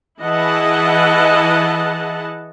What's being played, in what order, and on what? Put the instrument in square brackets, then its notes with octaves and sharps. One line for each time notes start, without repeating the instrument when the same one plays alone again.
[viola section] E3 E4 G#4 D#5 F#5 A5